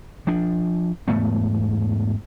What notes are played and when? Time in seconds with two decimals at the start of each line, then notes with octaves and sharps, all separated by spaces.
0.27 F3 D4
1.08 E2 G#2 A3 B3